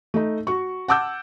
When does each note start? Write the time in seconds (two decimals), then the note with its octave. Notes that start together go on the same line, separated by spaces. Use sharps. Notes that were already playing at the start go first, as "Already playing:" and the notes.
0.14 A3 D#4
0.47 F#4 C#6
0.88 F#5 A5 D6 E6 G6